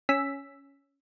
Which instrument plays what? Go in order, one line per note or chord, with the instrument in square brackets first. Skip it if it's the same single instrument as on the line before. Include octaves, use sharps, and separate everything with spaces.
[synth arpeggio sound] C#4 G#5 E6 B6